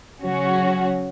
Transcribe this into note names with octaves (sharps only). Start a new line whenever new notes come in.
C#3 F#3 C#4 F#4